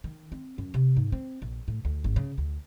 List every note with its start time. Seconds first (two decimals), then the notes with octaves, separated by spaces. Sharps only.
0.04 D#3
0.32 C4
0.58 F#2
0.74 C3
0.97 G#2
1.12 C4
1.42 A#1
1.68 A2
1.85 D2
2.04 G#1
2.16 C#3
2.38 D2